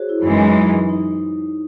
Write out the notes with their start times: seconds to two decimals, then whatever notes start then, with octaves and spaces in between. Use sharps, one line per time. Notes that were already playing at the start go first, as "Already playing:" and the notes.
Already playing: F#4 G#4 C5 C#5
0.09 E4
0.25 F#2 E3 G#3 D#4
0.89 D#4